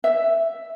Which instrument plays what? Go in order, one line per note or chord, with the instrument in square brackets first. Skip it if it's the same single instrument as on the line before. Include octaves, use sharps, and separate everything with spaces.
[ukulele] E5